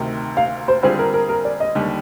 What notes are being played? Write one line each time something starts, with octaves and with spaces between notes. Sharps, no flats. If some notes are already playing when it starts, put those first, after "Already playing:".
Already playing: D2 C3 D#3
F5
C5
D3 G3 C4 F4 G#4 C5
A#4
A#4
A#4
D5
D#5
D#2 D3 G3